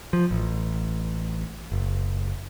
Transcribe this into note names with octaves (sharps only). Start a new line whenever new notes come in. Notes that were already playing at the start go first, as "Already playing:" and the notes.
F3
A1
F#1